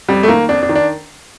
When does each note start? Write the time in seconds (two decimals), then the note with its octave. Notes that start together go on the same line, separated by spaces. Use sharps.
0.09 F2 G3
0.23 A3
0.28 D#3 A#3
0.49 F2 D4
0.63 D4
0.69 D#3
0.75 D4